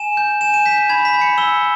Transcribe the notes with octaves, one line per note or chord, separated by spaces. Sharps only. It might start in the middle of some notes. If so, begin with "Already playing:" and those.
Already playing: G#5 E7
G6
G#5 E7
D#7
G6 B6
G6
B5 G#6
B6
B5
C#7
E6 G7